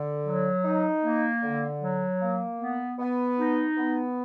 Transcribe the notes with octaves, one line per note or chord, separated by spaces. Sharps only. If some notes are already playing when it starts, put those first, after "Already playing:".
Already playing: D3
F#3
D#4
A#3
D3
F#3
A#3
B3
B3
D#4
B3